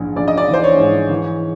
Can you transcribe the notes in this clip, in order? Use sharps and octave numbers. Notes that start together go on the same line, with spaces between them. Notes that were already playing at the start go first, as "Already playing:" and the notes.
Already playing: A#1 G#2 E3
A#1 D5
D#5
D5
E3
C5
C#5
G#2
E3